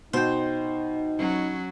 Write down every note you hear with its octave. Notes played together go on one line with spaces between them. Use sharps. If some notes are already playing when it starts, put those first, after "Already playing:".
B2 D#4 C5 G5
F#3 C#4